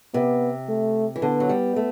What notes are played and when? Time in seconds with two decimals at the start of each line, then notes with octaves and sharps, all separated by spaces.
0.14 C3 B3
0.69 A3
1.16 E3
1.22 D3 B3
1.40 F#3
1.49 G3
1.76 A3